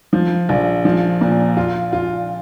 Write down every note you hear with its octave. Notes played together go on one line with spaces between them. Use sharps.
F3
A#1
F3
A#2
F4
F4